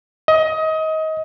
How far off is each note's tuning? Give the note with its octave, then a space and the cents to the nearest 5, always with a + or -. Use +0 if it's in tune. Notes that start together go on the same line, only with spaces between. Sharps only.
D#5 +25